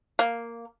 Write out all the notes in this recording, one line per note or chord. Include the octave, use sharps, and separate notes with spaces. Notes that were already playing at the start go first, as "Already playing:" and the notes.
A#3